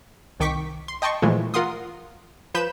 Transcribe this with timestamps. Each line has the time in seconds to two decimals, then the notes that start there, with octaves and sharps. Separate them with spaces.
0.40 C2 D#3 G5 C#6 D6 B6
0.88 C6
1.02 D#5 G5 A5 C6 C#6
1.22 A#2 E3 F3 G#3 A3
1.54 F4 A#4 F#5 C6 D#6
2.55 F3 B4 B5 G6 E7